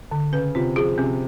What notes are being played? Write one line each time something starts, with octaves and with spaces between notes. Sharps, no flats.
D3
C#3 B4
C3 F4
F3 G#4
C3 C#4